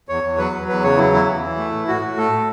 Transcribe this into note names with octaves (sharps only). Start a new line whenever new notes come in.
E2 C#5
E2
F#3 B4
F#3
E2 B4
C#3 C#5
F#3 E4
E2 E4
E3
E3
A3
A2
A2 F#4
A2
A3 A4
A2